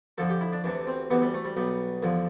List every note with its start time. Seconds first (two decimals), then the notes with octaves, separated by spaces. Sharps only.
0.18 F2 D3 F3 A4
0.30 G4
0.41 E4
0.53 D4
0.64 D2 C3 E3 D4
0.87 C4
1.10 D2 C3 E3 B3
1.22 G3
1.34 A3
1.45 G3
1.56 B1 B2 G3
2.02 E2 D3 F3